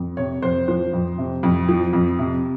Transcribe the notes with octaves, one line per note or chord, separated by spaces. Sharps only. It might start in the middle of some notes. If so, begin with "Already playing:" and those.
Already playing: F2
C3 C#5
F2 C5
F3 C5
F2
C3
F2
F3
F2
C3